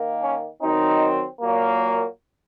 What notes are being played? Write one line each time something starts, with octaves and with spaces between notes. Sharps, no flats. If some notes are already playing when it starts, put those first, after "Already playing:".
Already playing: D#3 A#3
C#4
D#3 F#3 C4 D#4
A#2 F#3 A#3